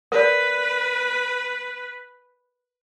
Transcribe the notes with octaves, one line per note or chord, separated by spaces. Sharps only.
A#4 B4 D5